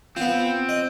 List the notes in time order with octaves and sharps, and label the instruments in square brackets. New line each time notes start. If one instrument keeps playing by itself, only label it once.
[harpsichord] B3 F4 [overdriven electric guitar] C4
[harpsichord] D#5